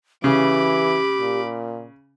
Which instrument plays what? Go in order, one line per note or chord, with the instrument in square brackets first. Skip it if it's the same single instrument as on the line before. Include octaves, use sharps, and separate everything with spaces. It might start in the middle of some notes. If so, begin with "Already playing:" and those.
[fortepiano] C#3 [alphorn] E3 [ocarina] G4 [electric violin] B5 D6
[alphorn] A#2